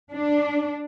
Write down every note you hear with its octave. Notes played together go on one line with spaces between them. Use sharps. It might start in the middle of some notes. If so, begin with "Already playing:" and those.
D4